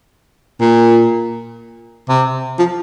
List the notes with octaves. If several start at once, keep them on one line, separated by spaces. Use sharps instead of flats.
A#2
C3
F3